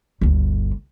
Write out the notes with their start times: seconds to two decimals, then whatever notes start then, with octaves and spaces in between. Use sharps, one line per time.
0.21 G1 D2